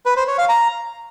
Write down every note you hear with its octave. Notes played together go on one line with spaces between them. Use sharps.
B4
C5
C#5
F5
A#5